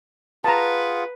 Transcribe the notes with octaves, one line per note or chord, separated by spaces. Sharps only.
F4 G#4 B4 F#5 A5 A#5